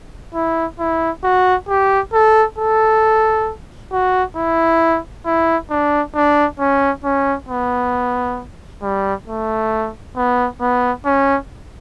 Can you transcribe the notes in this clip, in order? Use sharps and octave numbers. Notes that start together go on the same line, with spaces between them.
E4
E4
F#4
G4
A4
A4
F#4
E4
E4
D4
D4
C#4
C#4
B3
G3
A3
B3
B3
C#4